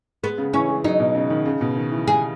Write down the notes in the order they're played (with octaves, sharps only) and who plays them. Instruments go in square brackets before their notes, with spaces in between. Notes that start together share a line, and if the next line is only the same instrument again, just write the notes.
[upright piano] G#3 [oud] B3
[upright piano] C#3
[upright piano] E3 [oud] C#4
[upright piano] G#3
[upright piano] F#3 [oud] D#4
[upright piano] B2
C#3
D#3
C#3
B2
D#3
E3
[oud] G#4